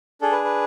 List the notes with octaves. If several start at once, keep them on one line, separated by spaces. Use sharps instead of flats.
D4 G#4 A4
B4
B4